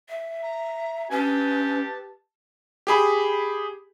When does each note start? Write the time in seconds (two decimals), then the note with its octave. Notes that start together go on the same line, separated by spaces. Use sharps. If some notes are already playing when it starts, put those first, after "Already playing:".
0.09 E5
0.43 A#5
1.11 C#4 G4 B4 A5
2.87 G4 G#4 B5